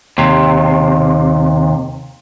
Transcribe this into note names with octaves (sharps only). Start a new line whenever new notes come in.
D#2 C3